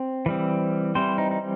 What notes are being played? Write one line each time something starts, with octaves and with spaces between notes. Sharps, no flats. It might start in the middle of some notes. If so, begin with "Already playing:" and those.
Already playing: C4
E3 G3 C4
E3 G3 C4 C5
D#4
D#4